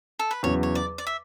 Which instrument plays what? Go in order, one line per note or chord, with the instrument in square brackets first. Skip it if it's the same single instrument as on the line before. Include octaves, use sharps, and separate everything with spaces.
[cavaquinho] A4
B4
[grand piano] E2 C#3 F#3 [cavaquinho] C#5
[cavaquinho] C#5
D5
D5
E5